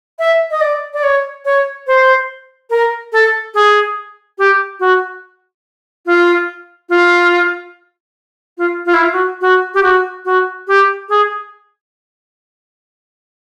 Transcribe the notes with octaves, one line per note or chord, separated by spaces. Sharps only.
E5
D#5
D5
D5
C#5
C#5
C5
A#4
A4
G#4
G4
F#4
F4
F4
F4
F4
E4
F4
F#4
F#4
G4
F#4
F#4
G4
G#4